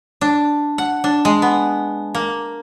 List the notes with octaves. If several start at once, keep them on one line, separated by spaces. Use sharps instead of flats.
D4
F#5
D4
G#3
B3
A#3